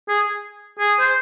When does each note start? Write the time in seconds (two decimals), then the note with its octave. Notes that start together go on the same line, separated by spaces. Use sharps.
0.09 G#4
0.79 G#4
1.00 C5